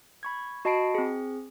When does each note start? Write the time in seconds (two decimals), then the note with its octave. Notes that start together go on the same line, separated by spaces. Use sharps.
0.23 B5 C#6 G#6
0.65 F#4 D#5 A5 B5 C7 D7
0.95 C4 G#4